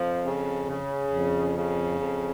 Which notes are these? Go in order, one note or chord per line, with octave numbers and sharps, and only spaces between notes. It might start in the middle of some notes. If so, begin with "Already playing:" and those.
Already playing: F2 F3
C#3
C#3
F2
C#3
F2